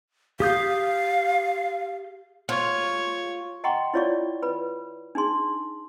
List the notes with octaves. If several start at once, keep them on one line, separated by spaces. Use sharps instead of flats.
G4 F5 D#6 G6
F4 C#5
D#5 F#5 G5 A#5 C6 C#6
E4 F4 C#5 D5 F5 C#6
B4 B5
D4 D#4 G#4 C6